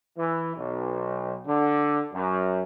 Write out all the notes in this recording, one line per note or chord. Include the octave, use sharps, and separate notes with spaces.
E3
B1
D3
F#2